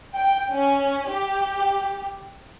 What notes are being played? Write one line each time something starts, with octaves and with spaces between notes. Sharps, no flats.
G5
C#4
G4